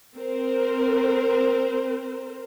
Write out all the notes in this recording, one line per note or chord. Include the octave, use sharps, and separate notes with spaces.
C4 A#4 C5